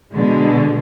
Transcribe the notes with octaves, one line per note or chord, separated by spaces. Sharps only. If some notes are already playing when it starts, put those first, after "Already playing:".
B2 D3 G#3